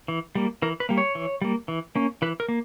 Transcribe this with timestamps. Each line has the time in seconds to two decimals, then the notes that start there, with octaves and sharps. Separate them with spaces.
0.08 E3
0.35 G3 A#3
0.62 E3 A#4
0.80 B4
0.89 G3 A#3
0.98 C#5
1.15 E3
1.41 G3 A#3
1.68 E3
1.96 A#3 C#4
2.22 E3 B4
2.40 A#4
2.49 A#3